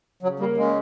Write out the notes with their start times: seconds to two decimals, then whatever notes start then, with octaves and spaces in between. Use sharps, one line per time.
0.22 C#3 F#3
0.40 G3 A#3
0.57 C#3 G#3